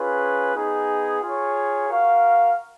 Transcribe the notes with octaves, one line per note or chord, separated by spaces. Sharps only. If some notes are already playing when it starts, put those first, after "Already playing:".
Already playing: C#4 F4 G#4 B4
B3 D#4 G#4
F4 G#4 C#5
F#4 A#4 F5